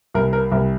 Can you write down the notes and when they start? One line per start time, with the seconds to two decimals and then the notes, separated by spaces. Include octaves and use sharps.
0.14 C2 A#4
0.33 A#4
0.51 C2 A#4